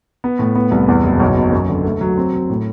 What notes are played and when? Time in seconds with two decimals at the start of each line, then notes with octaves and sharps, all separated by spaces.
0.24 B3
0.39 A2
0.55 B3
0.71 C2
0.88 E2
1.04 F#1
1.20 B1
1.37 B2
1.52 F#2
1.69 D3
1.84 A3
2.01 F#3
2.17 C4
2.33 F#3
2.50 A2